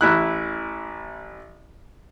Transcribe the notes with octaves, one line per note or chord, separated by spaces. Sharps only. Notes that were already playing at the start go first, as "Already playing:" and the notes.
A1 E4 F#6